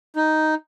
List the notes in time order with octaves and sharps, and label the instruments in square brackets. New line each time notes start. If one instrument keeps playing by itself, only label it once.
[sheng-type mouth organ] D#4